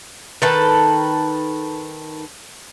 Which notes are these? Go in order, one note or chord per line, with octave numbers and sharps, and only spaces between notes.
D#3 A4 B4